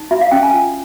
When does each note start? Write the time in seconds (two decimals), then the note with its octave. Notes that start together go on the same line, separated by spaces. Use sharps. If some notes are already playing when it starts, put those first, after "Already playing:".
Already playing: D#4
0.11 F#4 E5
0.21 F5
0.31 C#4 G5
0.43 G#5
0.53 F4